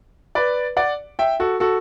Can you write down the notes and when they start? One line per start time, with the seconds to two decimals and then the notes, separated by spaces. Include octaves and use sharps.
0.35 B4 D5
0.77 D5 F#5
1.19 E5 G5
1.40 F#4 A4
1.60 F#4 A4